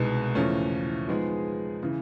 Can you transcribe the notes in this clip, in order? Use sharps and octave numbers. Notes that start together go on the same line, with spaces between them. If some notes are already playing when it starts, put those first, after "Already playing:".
Already playing: C2 B2 G#3 B3 D#4
E2 C#3 F3 A3 C#4
F3 G#3 B3 D#4 G#4
C#3 E3